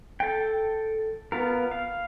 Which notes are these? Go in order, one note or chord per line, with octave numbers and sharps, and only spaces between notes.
A4 G5
B3 F4 A#4
F5